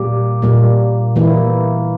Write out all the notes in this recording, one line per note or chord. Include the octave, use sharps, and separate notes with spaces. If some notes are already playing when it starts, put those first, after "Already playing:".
Already playing: A#2 G3 A#3 G4
A#2 G3 A#3
E3 A#3 E4